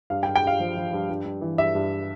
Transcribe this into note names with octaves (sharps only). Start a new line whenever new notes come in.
G2 F5
G5
G2
G5
G2 F5
F3
F3
G2
G2
G2
E3
G2 E5
G2